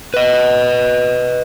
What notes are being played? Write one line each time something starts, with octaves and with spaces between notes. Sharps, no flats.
B4 D#5